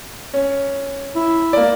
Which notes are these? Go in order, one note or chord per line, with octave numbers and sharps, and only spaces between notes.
C#4
E4
A#3 D5